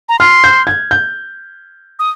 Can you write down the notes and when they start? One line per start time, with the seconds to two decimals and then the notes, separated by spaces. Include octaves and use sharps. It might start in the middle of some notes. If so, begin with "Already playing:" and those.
0.09 A#5
0.19 C6 F6
0.44 G6
0.67 G#6
0.91 G6
1.99 D#6